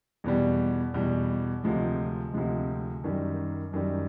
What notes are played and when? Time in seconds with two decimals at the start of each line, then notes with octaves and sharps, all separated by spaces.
0.24 E2 B2 G3
0.94 E2 B2 G3
1.64 D2 C3 F3 G#3
2.34 D2 C3 F3 G#3
3.04 F#2 D#3 G3
3.73 F#2 D#3 G3